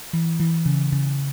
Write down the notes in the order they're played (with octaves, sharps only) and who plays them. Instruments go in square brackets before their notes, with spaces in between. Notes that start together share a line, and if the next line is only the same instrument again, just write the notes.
[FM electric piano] E3
E3
C#3
C#3